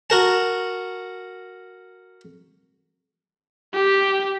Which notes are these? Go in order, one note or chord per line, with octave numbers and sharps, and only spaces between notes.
F#4 A#4 A5
G4